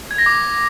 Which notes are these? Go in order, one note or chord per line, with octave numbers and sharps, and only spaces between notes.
G#6
A#6
D6